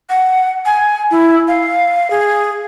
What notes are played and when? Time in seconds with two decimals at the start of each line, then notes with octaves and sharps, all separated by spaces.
0.10 F#5
0.66 G#5
1.11 E4
1.48 F5
2.10 G#4